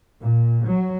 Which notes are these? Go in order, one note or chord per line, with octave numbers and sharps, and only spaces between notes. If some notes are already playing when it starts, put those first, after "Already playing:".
A#2
F#3